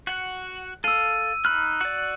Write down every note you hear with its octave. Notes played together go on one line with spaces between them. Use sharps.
F#4 F#5
A4 F5 E6 D#7
D#4 B5 F6 F#6
F#4 D5